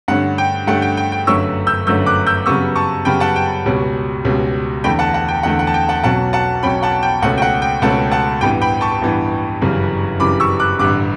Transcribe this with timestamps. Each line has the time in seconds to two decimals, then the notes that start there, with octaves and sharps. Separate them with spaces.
0.08 G2 D3 A3 C#4 F#5
0.38 G5
0.67 G2 D3 A3 C#4 F#5
0.82 G5
0.97 G5
1.12 G5
1.27 G1 F#2 D3 A3 C#4 C#6 E6
1.67 E6 G6
1.87 G1 F#2 D3 A3 C#4 E6 G6
2.06 D6 F#6
2.27 E6 G6
2.46 F#2 C#3 G3 B3 C#6 E6
2.76 A5 C#6
3.05 F#2 C#3 G3 B3 G5 B5
3.20 F#5 A5
3.36 G5
3.66 C#2 B2 G3 C#4
4.25 C#2 B2 G3 C#4
4.84 E2 D3 A3 G5 B5
4.99 F#5 A5
5.14 F#5
5.28 G5
5.43 E2 D3 A3 F#5
5.59 F#5
5.67 A5
5.74 G5
5.89 F#5 A5
6.03 B1 B2 F#3 C#4 F#5 A5
6.33 F#5 A5
6.63 B1 B2 F#3 C#4 G5 B5
6.83 F#5 A5
7.03 G5
7.22 C#2 B2 A3 C#4 F#5
7.38 G5
7.42 F#5
7.62 G5
7.82 C#2 B2 A3 C#4 F#5 A5
8.11 F#5 A5
8.41 A1 G2 E3 B3 G5 B5
8.62 G5 B5
8.81 A5 C#6
9.02 A1 G2 E3 B3
9.61 G1 F#2 C#3 E3 G3
10.20 G1 F#2 C#3 E3 G3 B5 D6
10.40 C#6 E6
10.59 D6 F#6
10.79 A1 G2 D3 D6 F#6